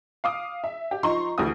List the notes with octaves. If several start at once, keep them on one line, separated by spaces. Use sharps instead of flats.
F5 D6 D#6
E5
G4
F3 D#4 A#5 C6 C#6
D2 E3 G4 D#6